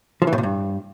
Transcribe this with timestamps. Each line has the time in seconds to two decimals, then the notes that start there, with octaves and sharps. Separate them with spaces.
0.22 F3
0.27 E3
0.33 A2
0.38 A#2
0.43 G2